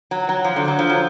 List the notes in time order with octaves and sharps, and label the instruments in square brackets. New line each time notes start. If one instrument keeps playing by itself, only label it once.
[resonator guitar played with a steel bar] F#3
F#3
F3
D3
F#3
F3
F#3